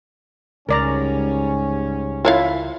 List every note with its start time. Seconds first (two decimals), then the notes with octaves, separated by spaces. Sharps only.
0.69 C#2 G#2 G3 C#4 A#4 D5 A#5
2.25 C4 E4 F4 C#5 F5